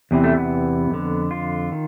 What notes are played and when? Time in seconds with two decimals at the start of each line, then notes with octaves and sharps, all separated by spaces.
0.11 E2 C3 E3
0.24 A3
0.37 B3
0.91 F2 D3
1.31 F4
1.72 D#3